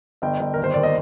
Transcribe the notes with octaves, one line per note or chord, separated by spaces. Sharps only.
G1 D#5 G5
G1
D#2 A#4
C5
D#2 D5
D#5